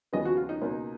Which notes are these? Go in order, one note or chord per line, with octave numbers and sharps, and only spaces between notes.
D#2 C#3 F3 G#3 B3 D#5
F#4
F4
D#4
C#2 B2 A#3